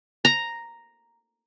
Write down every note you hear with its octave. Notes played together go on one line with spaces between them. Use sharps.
A#5